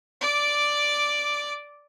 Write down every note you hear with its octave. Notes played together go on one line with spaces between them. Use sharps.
D5 D6